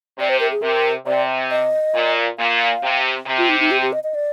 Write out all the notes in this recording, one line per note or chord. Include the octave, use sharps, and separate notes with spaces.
C3 D5
C5
A#4
G#4
C3 A#4
C3 D5
D#5
A#2
A#2 F5
C3
C3
F4
D#4
D#4
G4
G4
D#5
D#5
D5